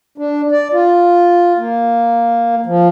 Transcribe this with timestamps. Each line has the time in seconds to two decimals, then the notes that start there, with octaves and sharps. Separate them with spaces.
0.18 D4
0.52 D5
0.73 F4
1.57 A#3
2.66 F3